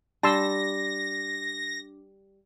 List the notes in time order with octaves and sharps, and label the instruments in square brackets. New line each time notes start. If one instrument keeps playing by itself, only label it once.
[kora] G3 [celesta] D4 D6 [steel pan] A5 C6 E6 [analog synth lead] A#6